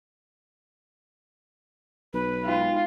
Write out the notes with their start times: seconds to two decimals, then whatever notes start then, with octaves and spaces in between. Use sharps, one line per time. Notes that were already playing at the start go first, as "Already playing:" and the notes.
2.13 B1 B4
2.45 G#3 D#4 F4 G5